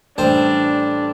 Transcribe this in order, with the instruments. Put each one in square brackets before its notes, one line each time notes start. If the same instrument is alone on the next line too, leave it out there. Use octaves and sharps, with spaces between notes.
[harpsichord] A1 G3 C5 [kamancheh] D4